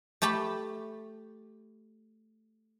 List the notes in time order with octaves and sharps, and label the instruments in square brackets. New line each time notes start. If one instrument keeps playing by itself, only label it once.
[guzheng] A3 G4 A5 B5